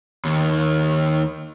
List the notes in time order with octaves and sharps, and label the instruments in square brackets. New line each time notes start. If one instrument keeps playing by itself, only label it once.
[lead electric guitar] D#2